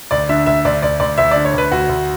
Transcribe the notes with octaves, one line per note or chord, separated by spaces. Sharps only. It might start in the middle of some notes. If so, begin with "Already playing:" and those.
D2 D5
D3 E5
D2 E5
D2 D5
D2 D5
D2 D5
D2 E5
D3 D5
C#5
D2 B4
D2 F#4
D2